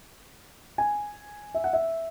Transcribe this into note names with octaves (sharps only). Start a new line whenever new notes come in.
G#5
E5
F#5
E5